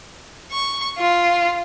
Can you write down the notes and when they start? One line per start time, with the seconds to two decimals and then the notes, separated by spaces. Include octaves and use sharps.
0.52 C#6
0.98 F4